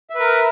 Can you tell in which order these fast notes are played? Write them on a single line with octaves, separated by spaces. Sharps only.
E5 B4 A#4